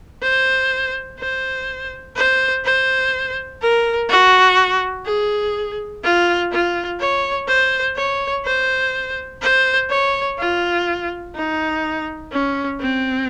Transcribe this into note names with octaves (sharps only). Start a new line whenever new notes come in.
C5
C5
C5
C5
A#4
F#4
G#4
F4
F4
C#5
C5
C#5
C5
C5
C#5
F4
D#4
C#4
C4